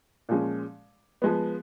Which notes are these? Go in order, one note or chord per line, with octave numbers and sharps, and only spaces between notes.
A#2 F3 G#3 C#4
F3 G#3 B3